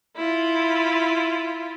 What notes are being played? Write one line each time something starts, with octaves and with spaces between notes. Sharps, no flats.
E4 F4